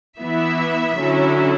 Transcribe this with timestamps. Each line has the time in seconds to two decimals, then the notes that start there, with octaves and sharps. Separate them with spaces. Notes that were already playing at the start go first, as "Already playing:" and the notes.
0.19 E3 B3 E4 E5
0.98 D3 F#3 C#4 E4